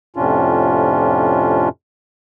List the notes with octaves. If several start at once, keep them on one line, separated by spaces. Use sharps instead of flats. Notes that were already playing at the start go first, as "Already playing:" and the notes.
F2 A2 C3 C#4 D4 F4